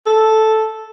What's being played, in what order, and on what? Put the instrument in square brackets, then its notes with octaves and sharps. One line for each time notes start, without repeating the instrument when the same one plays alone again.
[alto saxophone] A4